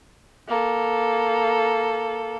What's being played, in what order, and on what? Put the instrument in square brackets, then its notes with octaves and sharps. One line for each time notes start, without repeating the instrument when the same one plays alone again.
[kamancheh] A#3 A4